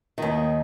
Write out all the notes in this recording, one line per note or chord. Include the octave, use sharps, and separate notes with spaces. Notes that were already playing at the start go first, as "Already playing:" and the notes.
D#2 D#3